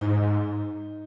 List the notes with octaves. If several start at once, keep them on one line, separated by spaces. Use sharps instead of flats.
G#2 D#4
G#2